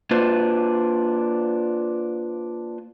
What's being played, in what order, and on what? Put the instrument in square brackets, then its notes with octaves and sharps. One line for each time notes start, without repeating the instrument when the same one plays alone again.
[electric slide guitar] A#3 D4 F4 B4 C5